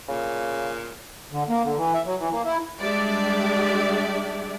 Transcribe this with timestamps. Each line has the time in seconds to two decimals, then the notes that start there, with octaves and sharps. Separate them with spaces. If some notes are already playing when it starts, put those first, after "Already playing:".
0.08 A#2 C#3
1.32 D3
1.49 A#3
1.63 D3
1.77 E3
1.94 E5
2.06 F#3
2.19 E3
2.32 A#3
2.45 E4
2.81 G3 G#3 D4 G4 D5 E5